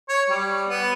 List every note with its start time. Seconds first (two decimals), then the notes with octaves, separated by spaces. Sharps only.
0.09 C#5
0.30 G3
0.69 B3